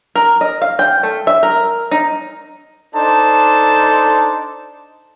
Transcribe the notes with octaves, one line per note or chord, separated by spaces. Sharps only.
A#4
D#5
F5
G5
A3
E5
A#4
D#4
D4 D#4 A4 C5 A5